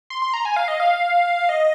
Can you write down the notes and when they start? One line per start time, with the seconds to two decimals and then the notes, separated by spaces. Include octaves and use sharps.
0.10 C6
0.22 C6
0.34 A#5
0.45 G#5
0.56 F5
0.68 D#5
0.80 F5
1.49 D#5